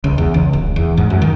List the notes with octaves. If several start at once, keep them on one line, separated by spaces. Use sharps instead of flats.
C#2
E2
C#2
D1
E2
G#2
F#2
D#3